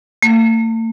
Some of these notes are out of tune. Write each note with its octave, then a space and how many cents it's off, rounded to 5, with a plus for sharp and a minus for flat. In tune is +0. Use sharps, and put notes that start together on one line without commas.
A3 +45